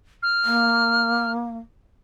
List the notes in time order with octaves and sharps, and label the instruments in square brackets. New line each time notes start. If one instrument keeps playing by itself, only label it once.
[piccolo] F6
[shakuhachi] A#3